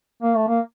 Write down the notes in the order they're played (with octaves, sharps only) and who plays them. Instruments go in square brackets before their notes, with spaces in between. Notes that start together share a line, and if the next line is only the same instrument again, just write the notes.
[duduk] A#3
A3
A#3